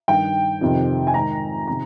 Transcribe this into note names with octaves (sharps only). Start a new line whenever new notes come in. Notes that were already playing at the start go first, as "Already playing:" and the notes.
G2 D#3 G5
F2 C3 D#3
G#5
G#2 D#3 A#5
C3 D#3 A#5